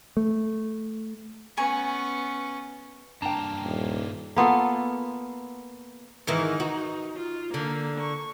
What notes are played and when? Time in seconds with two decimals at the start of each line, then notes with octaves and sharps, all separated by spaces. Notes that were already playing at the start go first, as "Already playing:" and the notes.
0.17 A3
1.57 B3 C#4 G#5 C#6
3.22 G2 A#3 D4 G5 A5 A#5
3.64 D#1
4.36 A#3 B3 F4 A4
6.27 G#2 D#3 E3 D#4
6.60 F#4
7.16 F4
7.54 D3 A#3
8.00 C#6